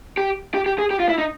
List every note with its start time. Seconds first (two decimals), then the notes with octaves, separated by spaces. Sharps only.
0.17 G4
0.54 G4
0.66 G4
0.79 G#4
0.91 G4
1.00 F4
1.09 E4
1.18 D#4